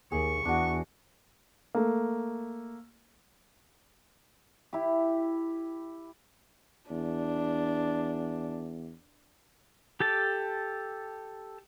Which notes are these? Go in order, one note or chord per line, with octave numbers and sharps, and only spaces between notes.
D#2 G#4 C#6
E2 D4 F#4
A3 A#3
E4 G4
E2 D4
G4 A4 A5